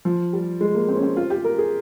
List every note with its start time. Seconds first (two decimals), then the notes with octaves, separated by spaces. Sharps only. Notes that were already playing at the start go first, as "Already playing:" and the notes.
0.05 F3
0.33 G3
0.61 G#3
0.75 A#3
0.88 C4
0.96 C#4
1.03 C4
1.17 F4
1.30 G4
1.44 A#4
1.58 G#4